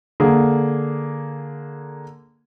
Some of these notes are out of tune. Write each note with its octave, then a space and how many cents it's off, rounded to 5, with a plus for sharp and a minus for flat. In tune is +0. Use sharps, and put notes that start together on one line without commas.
D3 +0 A#3 +0 G#4 +0